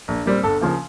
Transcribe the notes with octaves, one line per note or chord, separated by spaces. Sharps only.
A#1
A#2 G3 C4
G1 A4
C#3 F3 A#3